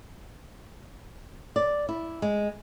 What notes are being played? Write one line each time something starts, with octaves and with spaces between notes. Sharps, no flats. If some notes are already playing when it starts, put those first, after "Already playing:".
D5
E4
G#3